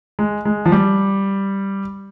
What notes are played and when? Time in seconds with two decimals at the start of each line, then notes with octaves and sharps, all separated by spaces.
0.19 G#3
0.45 G#3
0.66 F3
0.72 G3